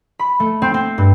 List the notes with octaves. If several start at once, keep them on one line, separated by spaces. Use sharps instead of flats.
B5
A3
C4
C4
G2